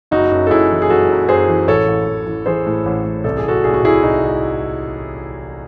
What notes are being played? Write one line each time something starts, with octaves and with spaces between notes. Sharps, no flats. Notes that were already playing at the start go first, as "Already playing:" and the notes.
F#1 D#4 F#4
F#2
A4
F#2 E4 G#4
E3
G#4
F#1 F#4 A4
F#2
F#2 G#4 C5
E3
A1 A4 C#5
A1
A1
E3
E3 G#4 C5
A2
A1
A1
C2 A4
G#4
C2 F#4 A4
C2 G#4
F#4
C2 E4 G#4
C2 D#4 F#4
C2